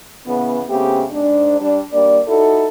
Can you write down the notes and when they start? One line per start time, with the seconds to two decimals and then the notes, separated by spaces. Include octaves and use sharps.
0.26 C#3 E3 B3
0.68 C#3 A3 B3 C4 G4
1.11 G#2 D4
1.61 G3 D4
1.93 G3 A#3 D4 D5
2.28 D#4 E4 F#4 A4